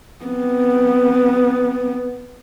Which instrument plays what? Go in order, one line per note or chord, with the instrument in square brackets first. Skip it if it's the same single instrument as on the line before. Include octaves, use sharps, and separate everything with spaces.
[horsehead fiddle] B3 C4